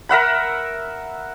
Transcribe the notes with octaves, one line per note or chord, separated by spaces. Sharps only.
A#4 E5 F#5 B5